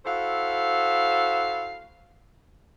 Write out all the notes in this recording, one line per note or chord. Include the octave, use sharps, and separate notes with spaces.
E4 F#4 A4 C5 F5